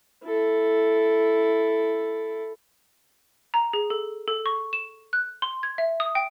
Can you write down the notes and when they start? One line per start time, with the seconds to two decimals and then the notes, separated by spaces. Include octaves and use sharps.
0.25 E4 A4
3.54 A#5
3.73 G#4
3.90 A4
4.28 A4
4.46 C#6
4.73 E7
5.13 F#6
5.42 C6
5.63 G#6
5.78 E5
6.00 D#6
6.15 G5